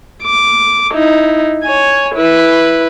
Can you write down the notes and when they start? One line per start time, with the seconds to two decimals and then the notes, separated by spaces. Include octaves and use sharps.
0.23 D6
0.93 D#4 E4
1.63 C#5 G#5
2.15 E4 B4